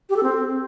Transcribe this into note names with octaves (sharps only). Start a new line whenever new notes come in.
G4
A4
C4